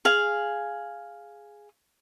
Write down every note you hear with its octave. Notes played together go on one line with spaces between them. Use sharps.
G#4 F5